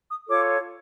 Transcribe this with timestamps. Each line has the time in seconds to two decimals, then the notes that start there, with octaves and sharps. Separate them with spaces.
0.08 D#6
0.28 F4 A4 C#5 D6